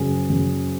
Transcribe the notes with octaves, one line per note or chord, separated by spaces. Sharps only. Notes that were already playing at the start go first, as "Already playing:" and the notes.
Already playing: F#1 F#2 C#3 G#4
F#1 F#2 C#3